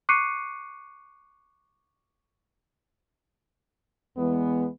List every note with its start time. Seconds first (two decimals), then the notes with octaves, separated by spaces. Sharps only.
0.09 C#6 D6 F#6 C7 C#7 D#7
4.17 E2 E3 G#3 B3